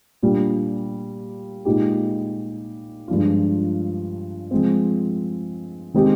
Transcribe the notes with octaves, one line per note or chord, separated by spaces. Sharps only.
A#2 G3 D4
A#2 G#3 D#4 G4
G2 F3 G#3 D4 F4
F3 G#3 C4
D#3 G#3 C4 D#4 G4